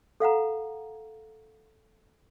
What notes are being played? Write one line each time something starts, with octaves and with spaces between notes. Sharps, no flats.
A4 F5 F#5 A#5